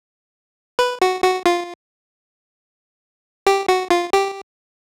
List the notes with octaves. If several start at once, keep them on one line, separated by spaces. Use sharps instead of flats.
B4
F#4
F#4
F4
G4
F#4
F4
G4